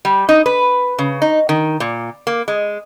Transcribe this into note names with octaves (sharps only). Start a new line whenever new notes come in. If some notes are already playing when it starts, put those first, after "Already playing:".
G3
D#4
B4
C#3
D#4
D#3
A#2
A#3
G#3